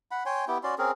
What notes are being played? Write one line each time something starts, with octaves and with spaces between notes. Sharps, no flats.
F#5 B5
C#5 G5 G#5 C6
B3 E4 G4 G5
C#4 F#4 D5 C6
C4 C#4 G#4 A#4